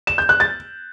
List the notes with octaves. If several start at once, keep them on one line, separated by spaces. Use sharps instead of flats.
E7
G6
F#6
A6